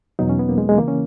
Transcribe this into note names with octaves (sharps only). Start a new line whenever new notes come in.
E2 B2 F#3 D#4
C#4
B3
A#3
G#3
G#3
C#3 E3 A#3
C#4